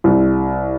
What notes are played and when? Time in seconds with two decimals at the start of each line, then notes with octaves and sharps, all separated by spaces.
0.04 C2